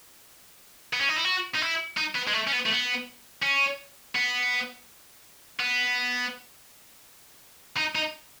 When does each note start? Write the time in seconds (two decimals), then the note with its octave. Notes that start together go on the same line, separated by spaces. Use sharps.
0.93 B3
1.01 C#4
1.09 D#4
1.16 E4
1.25 F#4
1.55 D#4
1.62 E4
1.97 D#4
2.15 B3
2.27 G#3
2.33 A3
2.47 C#4
2.52 B3
2.65 A3
2.70 B3
3.42 C#4
4.15 B3
5.60 B3
7.77 D#4
7.96 D#4